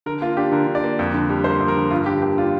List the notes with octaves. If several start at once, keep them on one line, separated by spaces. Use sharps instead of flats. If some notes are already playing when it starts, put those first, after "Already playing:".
D3 A#4
A#3 F4
D4 G4
D3 A#4
D3
D5
A#3
F2
D3
G3
A#3 C5
F2
A#4
D3
G2 F4
D3 G4
A#3 G4
D4 F4